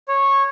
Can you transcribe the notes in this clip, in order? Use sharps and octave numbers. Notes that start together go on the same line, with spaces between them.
C#5